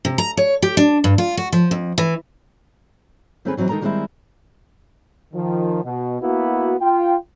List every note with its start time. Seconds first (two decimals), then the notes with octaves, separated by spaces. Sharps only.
0.05 C3
0.18 A#5
0.37 C#5
0.62 G4
0.77 D4
1.04 G2
1.18 F4
1.37 F#4
1.53 F3
1.71 F2
1.98 E3
3.45 D#3 A3 C4 C#4 G#4 B4
3.57 E3 F#3 C4 D#4 E4
3.69 D#3 G#3 D#4 A4 A#4 A#5
3.81 D#3 G3 G#3 C4 D#4 E4
5.34 D#3 F3
5.84 B2
6.22 A#3 B3 E4 F#4
6.81 F4 G5